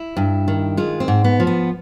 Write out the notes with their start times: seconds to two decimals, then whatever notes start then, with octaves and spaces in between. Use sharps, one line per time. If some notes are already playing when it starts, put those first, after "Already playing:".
Already playing: E4
0.17 G2
0.48 D#3
0.77 G#3 F4
1.00 C4
1.08 G#2
1.24 B3
1.40 F3
1.47 B3